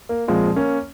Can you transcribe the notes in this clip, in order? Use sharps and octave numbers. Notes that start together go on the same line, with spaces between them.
A#3
A#2 F3 G#3 C4
A#3 C#4